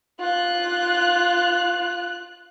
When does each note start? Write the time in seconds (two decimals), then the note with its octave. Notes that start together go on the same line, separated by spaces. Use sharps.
0.20 F4 F#6